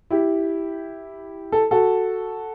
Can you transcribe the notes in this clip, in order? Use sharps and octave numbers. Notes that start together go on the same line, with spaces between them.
E4 G4
A4
F#4 A4